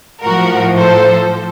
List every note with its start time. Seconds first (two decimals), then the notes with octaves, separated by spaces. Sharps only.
0.22 A2 F3 F#4 A#4
0.76 A4 C5